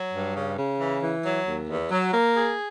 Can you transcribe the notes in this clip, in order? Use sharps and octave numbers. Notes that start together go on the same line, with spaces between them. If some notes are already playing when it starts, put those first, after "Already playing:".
Already playing: F#3
G2
C#3
C#3
E3
E3
F#3
D#2
E2
F#3
A#3
G#4